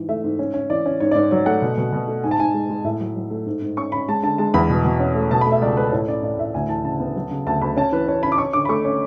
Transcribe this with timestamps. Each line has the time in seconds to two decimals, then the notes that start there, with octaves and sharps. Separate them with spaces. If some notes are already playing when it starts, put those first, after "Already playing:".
Already playing: G#2 E3
0.09 A3 E5
0.24 G#2
0.39 C#4
0.54 C#4
0.70 E3 D5
0.86 C#4
1.00 G#2 C#5
1.11 D5
1.15 G#2 C#5
1.31 F#3 C#5
1.46 A3 F#5
1.62 B2
1.78 B2
1.93 B2
2.08 A3
2.24 G#2 G#5
2.31 A5
2.39 G#2 G#5
2.54 G#3
2.70 G#3
2.84 A2 E5
3.00 F#3
3.16 F#3
3.31 A3
3.46 G#2
3.62 G#2
3.77 C#4 C#6
3.92 C#4 B5
4.09 G#3 A5
4.23 D3 A5
4.38 G#3 A5
4.54 E2 B5
4.70 B2
4.84 B2
5.00 C#4
5.15 A3
5.31 B2 A5
5.41 B5
5.46 A3
5.52 E5
5.61 C#2 D5
5.77 A3 B4
5.92 A2 C#5
6.08 C#4 D5
6.23 A2 D5
6.38 A2 E5
6.54 D2 G#5
6.69 E3 A5
6.84 C#3 A5
7.00 B3
7.16 F#3
7.31 C#3
7.46 D2 A5
7.61 D2 B5
7.76 C#4 A5
7.92 E3 B4
8.07 C#4 C#5
8.23 C#4 B5
8.32 D6
8.38 C#4 C#6
8.53 D3 D6
8.65 B5
8.69 A3 C#6
8.85 C#4